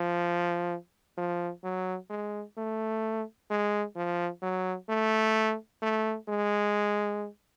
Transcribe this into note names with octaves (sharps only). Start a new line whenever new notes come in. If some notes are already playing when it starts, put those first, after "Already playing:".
Already playing: F3
F3
F#3
G#3
A3
G#3
F3
F#3
A3
A3
G#3